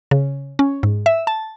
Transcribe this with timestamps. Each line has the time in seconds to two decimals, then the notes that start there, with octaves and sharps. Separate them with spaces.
0.11 C#3
0.59 C#4
0.83 G#2
1.06 E5
1.27 A5